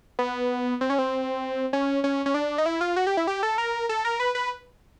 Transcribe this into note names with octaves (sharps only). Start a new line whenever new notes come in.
B3
C4
C#4
C4
C#4
C#4
C#4
D4
D#4
E4
F4
F#4
G4
E4
G4
A4
A#4
A4
A#4
B4
B4